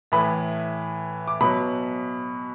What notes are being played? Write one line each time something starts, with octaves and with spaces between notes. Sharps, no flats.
A2 E3 B5
D6
B2 F#3 B5